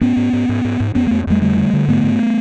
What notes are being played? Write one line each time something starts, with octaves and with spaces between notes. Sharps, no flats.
G#2 B3 C#4
G#2
G#2
G#2
G#2
G#2
F2 B3 C#4
F2 A3 B3
F2 G3 A3
D3 G3 A3
D3
D3
G#2 A3 B3
G#2